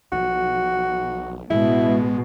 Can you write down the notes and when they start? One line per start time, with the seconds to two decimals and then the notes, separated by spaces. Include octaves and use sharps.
0.12 B1 F3 F#4
1.50 A1 B2 G#3 E4